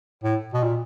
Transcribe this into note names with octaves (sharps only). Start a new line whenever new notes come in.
A2
B2
A#2